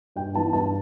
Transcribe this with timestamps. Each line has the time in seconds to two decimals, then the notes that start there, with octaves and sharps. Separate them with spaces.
0.16 G2 G5
0.35 E3 B3 A5
0.53 G2 A5